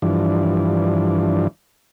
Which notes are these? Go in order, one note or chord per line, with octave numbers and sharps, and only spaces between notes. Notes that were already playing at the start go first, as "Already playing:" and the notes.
G2 E3 F3 D4